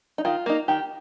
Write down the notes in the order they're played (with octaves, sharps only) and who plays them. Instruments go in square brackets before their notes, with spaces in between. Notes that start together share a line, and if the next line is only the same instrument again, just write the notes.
[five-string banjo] D#4
D#3 F4
A#3 D#4
D#3 G4